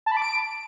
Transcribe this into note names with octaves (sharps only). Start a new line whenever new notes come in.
A5
B5
D6
D7